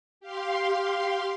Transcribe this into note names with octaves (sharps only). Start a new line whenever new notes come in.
G4 F5 C6